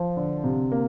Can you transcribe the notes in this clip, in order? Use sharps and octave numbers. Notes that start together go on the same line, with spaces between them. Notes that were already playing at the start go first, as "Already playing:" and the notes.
Already playing: F3
D3
C3
A#3